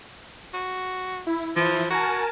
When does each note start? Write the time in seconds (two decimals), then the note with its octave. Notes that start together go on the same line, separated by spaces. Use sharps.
0.54 F#4
1.27 E4
1.56 E3 F3 E4
1.90 F#4 A#4 G#5 A5